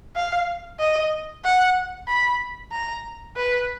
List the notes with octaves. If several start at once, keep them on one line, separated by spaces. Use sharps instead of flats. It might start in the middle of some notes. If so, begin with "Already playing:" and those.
F5
D#5
F#5
B5
A#5
B4